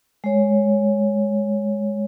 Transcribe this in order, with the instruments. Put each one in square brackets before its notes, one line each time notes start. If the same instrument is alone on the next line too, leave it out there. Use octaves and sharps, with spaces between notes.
[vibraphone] G#3 C#5